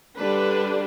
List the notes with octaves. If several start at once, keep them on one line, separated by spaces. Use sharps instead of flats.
D3 G3 D4 B4